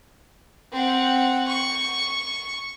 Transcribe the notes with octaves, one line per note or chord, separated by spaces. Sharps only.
C4 F#5
C#6